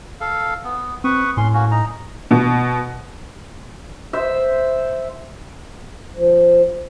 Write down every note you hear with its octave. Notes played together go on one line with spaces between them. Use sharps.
A4 F5
B3
C4 B4 C#6 D#6
A2 C#4 C6
A#3 C#4 F#4
D#4 A#5
B2
C5 E5
F3